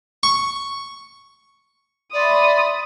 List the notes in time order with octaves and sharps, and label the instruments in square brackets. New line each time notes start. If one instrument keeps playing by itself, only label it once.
[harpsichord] C#6
[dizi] D5 [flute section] E5 B5 C6 [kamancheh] D#6